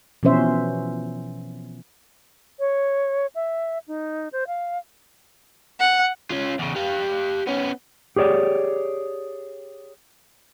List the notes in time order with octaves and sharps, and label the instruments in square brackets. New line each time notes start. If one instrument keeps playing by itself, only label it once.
[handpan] B2 E3 F3 C#4 C5 E5
[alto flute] C#5
E5
D#4
C5
F5
[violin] F#5
[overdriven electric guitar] C#4 F4
E2 C#3
G4 F5
B3 C#4
[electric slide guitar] G4 G#4 C#5 D5